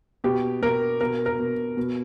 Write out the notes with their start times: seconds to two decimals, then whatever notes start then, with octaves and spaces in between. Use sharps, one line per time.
0.24 B2 G4
0.62 B2 A#4
1.01 B2 A#4
1.26 A#4
1.39 B2
1.77 B2